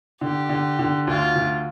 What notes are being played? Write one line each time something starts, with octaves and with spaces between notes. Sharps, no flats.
D3 G4
D3
D3
D2 F4
D2